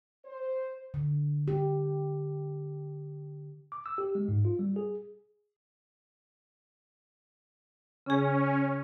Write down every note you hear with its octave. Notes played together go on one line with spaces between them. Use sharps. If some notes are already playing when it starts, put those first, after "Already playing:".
C5
D3
G4
D6
E6
G4
G#3
G#2
F4
G3
G#4
C#3 C#4 G#4